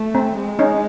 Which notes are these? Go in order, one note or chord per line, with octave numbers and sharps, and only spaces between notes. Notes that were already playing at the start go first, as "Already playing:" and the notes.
Already playing: A3
C4
G#3
C#4 D#4